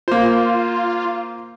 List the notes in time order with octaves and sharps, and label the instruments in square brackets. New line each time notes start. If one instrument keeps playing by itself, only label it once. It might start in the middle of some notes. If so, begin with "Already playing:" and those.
[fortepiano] A#3 C5 [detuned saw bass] F4